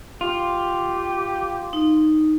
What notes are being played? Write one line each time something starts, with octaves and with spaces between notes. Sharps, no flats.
F4 G4
D#4